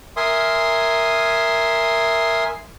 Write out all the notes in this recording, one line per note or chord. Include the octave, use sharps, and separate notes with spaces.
A#4 E5 G#5 C6 D#6